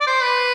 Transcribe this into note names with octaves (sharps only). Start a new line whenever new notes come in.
D5
C5
B4